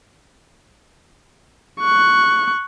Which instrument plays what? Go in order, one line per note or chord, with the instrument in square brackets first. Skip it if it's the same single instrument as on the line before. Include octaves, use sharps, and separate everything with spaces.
[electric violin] C#6 F#6